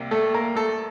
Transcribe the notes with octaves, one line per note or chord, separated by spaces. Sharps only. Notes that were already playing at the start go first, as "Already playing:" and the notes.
Already playing: C2 C3 A#3
A3 A4
A#3 A#4
A3 A4